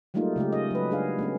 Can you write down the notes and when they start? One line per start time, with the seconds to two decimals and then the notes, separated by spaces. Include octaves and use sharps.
0.14 F#3 G3 A3 A#3 D#4 F4
0.36 C#3 G#3 A3 G4
0.53 D#5
0.71 F#3 B4
0.91 D4 G#4 F5
1.19 A3 B3 C#4